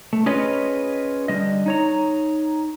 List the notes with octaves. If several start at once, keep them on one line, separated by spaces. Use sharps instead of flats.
A3
C#4 F4 G#4 B4 C#5 D#5
D3 G3 D#5
D#4 C#5 A#5